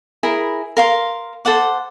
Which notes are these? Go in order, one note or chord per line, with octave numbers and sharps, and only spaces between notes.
E4 G#4 A#4
A#4 F5 C6
A4 C5 F#5 D6